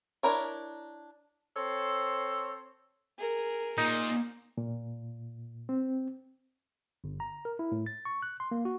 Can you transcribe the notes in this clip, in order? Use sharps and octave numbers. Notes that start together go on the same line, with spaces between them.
D4 E4 A#4 C#5
C4 A4 C5 C#5
G#4 A#4
A#2 D#4
A#2
C4
G1
A#5
A#4
E4
A2
A6
C#6
F#6
C6
A#3
F#4